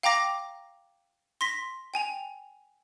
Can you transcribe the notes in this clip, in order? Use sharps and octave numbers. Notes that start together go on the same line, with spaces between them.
F5 G5 A#5 D6 A#6
C6 A#6 B6
G5 G#5 F7